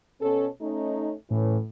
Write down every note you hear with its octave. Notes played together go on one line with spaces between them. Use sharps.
B2 C#4 A4
A3 C#4 D#4
A2 E3 C#4